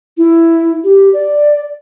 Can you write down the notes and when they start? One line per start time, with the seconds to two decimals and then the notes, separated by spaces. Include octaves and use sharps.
0.17 E4
0.84 G4
1.13 D5